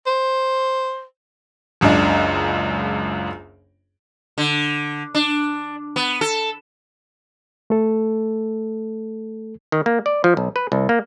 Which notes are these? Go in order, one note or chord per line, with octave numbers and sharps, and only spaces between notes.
C5
F#1 C#2 F#2 D4
D3
D4
B3
A4
A3 A4
D#3
A#3
D5
F3
B1
B4
C2
A#3